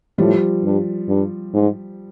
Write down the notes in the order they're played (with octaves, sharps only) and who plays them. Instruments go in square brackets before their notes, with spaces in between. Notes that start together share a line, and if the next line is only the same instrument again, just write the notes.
[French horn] A2 [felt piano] F3 G3
[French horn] G2
G2
G#2